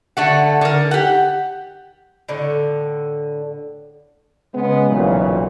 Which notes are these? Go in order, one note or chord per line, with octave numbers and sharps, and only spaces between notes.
D3 A3 F#5
D3 A#4
G4 F#5
A2 D3
C#3 G#3 B3
B1 F2 A#2 C#3 E3 F#3